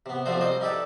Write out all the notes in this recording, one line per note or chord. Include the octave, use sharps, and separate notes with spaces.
C3 B3
C3 F3 A3 D4 F#4 C5
G3 C4 C5 D#5
D#4 E4 G4 A4 B4 D5